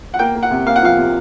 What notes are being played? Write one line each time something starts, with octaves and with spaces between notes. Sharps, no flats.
F#5
A#3 G5
A#3
F#5
C3
A#3 F5
F#5
F3 F5
C3